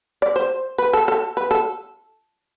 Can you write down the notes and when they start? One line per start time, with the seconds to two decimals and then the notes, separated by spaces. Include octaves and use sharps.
0.22 D5
0.36 C5
0.78 B4
0.93 A4
1.08 A4
1.37 B4
1.51 A4